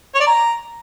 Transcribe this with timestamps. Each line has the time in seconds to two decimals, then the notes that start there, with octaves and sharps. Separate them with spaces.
0.15 C#5
0.21 D5
0.27 A#5